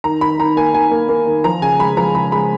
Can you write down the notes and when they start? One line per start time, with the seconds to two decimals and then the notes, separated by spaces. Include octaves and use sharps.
0.04 D#3 A#5
0.21 D#3 B5
0.39 D#3 A#5
0.57 A#3 G#5
0.74 D#3 G#5
0.91 A#3
1.09 A#3
1.27 D#3
1.44 F3 A#5
1.62 C#3 G#5
1.79 G#3 B5
1.97 F3 A#5
2.15 C#3 B5
2.32 G#3 B5